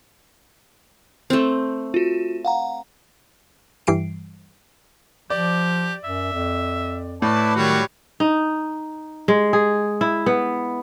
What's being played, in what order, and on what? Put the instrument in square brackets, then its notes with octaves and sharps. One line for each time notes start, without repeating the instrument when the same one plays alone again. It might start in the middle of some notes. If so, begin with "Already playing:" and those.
[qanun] A3 C4
[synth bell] F4 F#4
F5 F#5 A#5
[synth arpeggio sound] G2 E3 G3 C7 D7
[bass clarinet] F3 [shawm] G4 [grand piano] D5
[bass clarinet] F#2 [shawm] E5
[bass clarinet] F2
[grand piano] A2 [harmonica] B4 D5 A5
[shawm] E4
[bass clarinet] D#3 [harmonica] F#3 G3 B5 [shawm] F#4
[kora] D#4
G#3
G#4
E4
B3